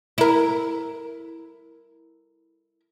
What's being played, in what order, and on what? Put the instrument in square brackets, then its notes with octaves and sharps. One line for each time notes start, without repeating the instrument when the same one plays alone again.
[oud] E4 A#4